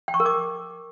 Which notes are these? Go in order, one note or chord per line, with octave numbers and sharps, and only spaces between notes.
G5
C#6
A#4
D6